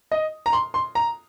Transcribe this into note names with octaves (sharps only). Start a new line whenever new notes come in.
D#5
A#5
C6
C6
A#5